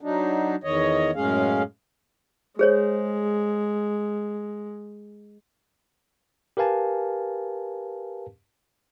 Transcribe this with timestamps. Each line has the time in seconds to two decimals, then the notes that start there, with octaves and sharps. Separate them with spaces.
0.01 F#3 D4 D#4
0.64 E2 D#3 C#5 D#5
1.15 F#2 A2 G#3 C#4 G#4 F5
2.59 G#3 G#4 C5 C#5
6.57 G4 A#4 B4 F5 G#5 A5